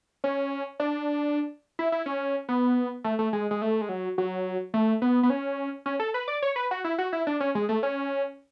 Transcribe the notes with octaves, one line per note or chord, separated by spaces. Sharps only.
C#4
D4
E4
E4
C#4
B3
A3
A3
G#3
G#3
A3
G#3
F#3
F#3
A3
B3
B3
C#4
C#4
A4
B4
D5
C#5
B4
F#4
E4
F#4
E4
D4
C#4
G#3
A3
C#4